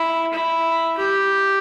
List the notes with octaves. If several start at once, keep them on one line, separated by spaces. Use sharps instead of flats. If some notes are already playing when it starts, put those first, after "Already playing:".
Already playing: E4
E4
G4